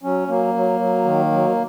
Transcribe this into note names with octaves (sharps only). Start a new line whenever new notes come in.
F#3 C#4
F#3 A#3
F#3
F#3
D#3
F#3